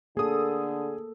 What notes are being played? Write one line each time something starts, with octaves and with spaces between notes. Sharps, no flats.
D3 A#3 G#4 A4 D#6